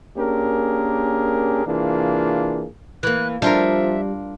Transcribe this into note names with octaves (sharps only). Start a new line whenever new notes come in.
A#3 C#4 D4 G4 G#4 A#4
C3 E3 A#3 D4 F4 G#4
E3 A#3 F#6
F3 G3 D4 F4 A#4 E5